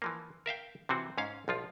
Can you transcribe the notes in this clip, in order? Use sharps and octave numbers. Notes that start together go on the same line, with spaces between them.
E3 F3 A#3
A#4 E5 F5 G5
C3 E3 C4 F#4
G#2 C#4 F5
B1 F3 F4